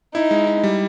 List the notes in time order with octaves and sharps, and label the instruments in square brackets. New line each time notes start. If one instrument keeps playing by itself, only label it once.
[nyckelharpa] D#4 [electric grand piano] E4
[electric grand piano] G#3
E4
G3